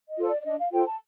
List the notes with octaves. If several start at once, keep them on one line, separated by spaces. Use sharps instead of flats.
D#5
F4 A4 C5
D5
D5
D4 D#5
F5
F4 A4 C5 G5
A5